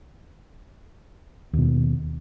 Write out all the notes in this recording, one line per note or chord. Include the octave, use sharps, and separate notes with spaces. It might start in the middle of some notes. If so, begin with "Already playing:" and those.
D#2 B2